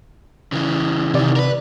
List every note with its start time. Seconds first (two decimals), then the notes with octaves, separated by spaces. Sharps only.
0.52 C#3 E3
1.14 C3 D#3 E3 D5
1.36 A#4 B4